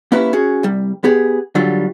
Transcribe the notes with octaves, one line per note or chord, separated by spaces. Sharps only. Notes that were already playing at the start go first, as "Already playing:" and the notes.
A#3 C#4 E4 G4 B4
C#4 F#4 G#4
C2 G3
B3 G4 G#4
D3 F#3 G3 F4